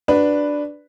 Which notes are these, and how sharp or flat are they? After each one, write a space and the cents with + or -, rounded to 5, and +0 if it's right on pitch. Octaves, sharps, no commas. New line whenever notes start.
D4 +0 F#4 +0 B4 +0